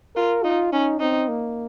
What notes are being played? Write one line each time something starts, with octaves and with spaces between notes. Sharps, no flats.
F4 A#4
D#4 F4
C#4 D#4
C4 D#4
A#3